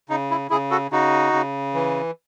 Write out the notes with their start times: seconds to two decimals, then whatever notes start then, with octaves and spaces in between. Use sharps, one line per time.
0.09 C#3 D#4
0.30 E4
0.50 C#3 E4 G#4
0.71 F#4 A4
0.91 C#3 D#4 F#4
1.33 C#3
1.74 E3